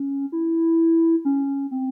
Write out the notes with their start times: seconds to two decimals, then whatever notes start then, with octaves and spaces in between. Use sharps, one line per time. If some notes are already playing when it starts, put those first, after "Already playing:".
Already playing: C#4
0.32 E4
1.25 C#4
1.71 C4